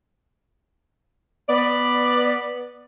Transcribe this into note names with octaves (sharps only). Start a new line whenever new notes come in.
B3 D5